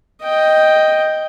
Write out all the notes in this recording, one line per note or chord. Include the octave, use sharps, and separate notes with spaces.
D#5 G5